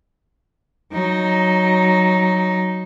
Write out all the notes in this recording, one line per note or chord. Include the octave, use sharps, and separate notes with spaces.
F#3 D#4